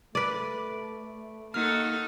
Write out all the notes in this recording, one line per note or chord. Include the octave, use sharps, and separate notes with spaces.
A3 B4 D5
A#3 D#4 F#4 A4 F6